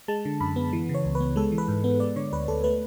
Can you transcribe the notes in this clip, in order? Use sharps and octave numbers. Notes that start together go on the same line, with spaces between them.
G#3 A5
D3
F#2 B5
B3
E3
C#3
C#5
C#2
B4
B3
G#3 A4
E3
B4
G#2
B3
G#3 D5
D3 C#5
D2 B4
D2 A4
A3 B4